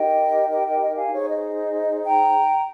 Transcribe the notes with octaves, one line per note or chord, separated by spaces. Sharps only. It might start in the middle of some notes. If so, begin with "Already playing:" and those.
Already playing: D#4 G4 A#4 D#5 G5
D#5 G5
D#5 G5
D#5
F5 G#5
D#4 G#4 C5 C#5
D#5
G5 A#5